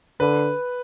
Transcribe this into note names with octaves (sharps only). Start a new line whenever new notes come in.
D3 B4